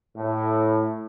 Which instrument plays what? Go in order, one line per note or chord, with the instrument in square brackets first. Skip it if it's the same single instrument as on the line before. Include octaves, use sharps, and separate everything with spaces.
[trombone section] A2